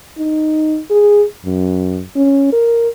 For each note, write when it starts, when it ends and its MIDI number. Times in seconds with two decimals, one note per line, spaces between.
0.18 0.80 63
0.90 1.24 68
1.45 2.03 42
2.16 2.48 61
2.52 2.89 70